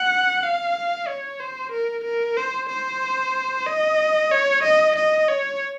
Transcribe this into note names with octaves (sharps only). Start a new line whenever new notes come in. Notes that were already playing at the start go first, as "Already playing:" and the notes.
Already playing: F#5
F5
C#5
C5
A#4
A#4
C5
C5
D#5
C#5
D#5
D#5
C#5